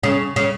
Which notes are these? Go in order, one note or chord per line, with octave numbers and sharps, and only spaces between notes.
C#3
C#3